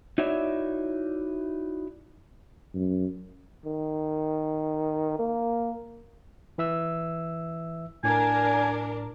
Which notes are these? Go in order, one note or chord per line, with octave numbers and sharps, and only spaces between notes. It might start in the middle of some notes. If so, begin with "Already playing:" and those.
D#4 E4 F#4 C#5 D5 E5
F#2
D#3
A#3
E3 E5 E6
A2 D4 A#4 G#5